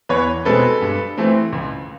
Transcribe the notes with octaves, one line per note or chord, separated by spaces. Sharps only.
E2 B4 C#5
B2 G#3 C4 A4 B4
G2
E3 A3 C4
C#2